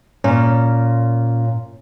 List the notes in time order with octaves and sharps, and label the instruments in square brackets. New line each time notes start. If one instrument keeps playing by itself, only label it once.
[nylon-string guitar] A#2 [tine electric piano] C#4